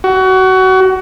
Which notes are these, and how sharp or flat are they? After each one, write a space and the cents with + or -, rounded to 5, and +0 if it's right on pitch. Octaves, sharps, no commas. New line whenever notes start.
F#4 +25